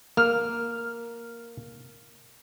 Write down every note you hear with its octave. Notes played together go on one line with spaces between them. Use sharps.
A#3 F6